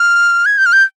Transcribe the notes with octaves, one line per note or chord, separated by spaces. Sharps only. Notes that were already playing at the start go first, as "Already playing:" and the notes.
Already playing: F6
G#6
G6
F6
G6